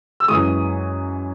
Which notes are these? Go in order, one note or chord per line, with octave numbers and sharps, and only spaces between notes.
E6
F#2 E3 G#3 D#6